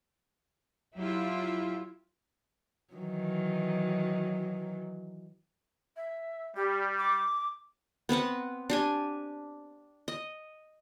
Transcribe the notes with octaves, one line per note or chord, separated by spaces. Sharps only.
F#3 E4 F4 G4
D#3 E3 F#3
E5
G3 G4
D6
B3 C4 B4 F#5
D4 G4 G#5
D#5